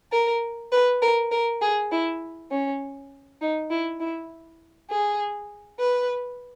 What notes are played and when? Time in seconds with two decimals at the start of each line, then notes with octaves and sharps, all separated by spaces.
0.12 A#4
0.72 B4
1.02 A#4
1.31 A#4
1.62 G#4
1.92 E4
2.51 C#4
3.41 D#4
3.71 E4
4.00 E4
4.90 G#4
5.79 B4